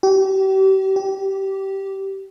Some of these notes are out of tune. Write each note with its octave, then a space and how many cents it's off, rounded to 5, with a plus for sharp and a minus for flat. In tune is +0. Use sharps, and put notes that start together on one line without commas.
G4 -35
G4 -15